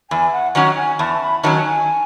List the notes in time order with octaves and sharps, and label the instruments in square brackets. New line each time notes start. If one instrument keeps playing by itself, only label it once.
[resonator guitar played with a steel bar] E2 [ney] G#5
[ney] F#5
[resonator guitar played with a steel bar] D#3 F#3 C#4 [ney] F#5
[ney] G#5
[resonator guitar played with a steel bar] E2 [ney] A5
[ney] B5
[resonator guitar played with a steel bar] D#3 F#3 C#4 [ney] A5
[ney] G#5